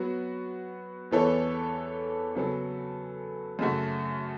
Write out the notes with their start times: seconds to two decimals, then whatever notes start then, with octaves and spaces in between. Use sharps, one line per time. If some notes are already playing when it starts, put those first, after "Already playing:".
Already playing: F#3 B3 F#4
1.11 E2 E3 B3 A4 C#5
2.35 C#3 F#3 B3 A4
3.59 F#2 C#3 A3 F#4